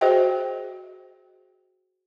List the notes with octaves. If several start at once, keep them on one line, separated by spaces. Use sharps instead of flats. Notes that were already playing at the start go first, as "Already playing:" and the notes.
F#4 G#4 C5 D#5 E5 G5